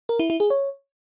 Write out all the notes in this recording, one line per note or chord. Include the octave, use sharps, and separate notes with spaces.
A#4
E4
E4
G#4
C#5